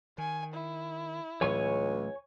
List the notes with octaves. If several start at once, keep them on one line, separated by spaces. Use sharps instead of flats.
D#3 G#5
E4
C#2 A2 E3 F#3 C#5 G#5 C#6